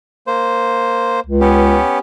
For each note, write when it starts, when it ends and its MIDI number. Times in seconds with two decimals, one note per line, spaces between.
0.27 1.20 58
0.27 1.20 72
1.26 1.78 37
1.41 1.99 59
1.41 1.99 61
1.41 1.99 67